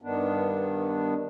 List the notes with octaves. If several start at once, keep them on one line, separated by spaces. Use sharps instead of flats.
G2 D#3 B3 D4